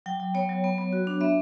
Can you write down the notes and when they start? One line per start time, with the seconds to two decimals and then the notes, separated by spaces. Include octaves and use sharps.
0.06 F#3 G5
0.20 F#3
0.34 B3 C#5
0.49 F#3
0.64 B3
0.78 B3
0.93 F#4
1.07 D4
1.21 B3 E5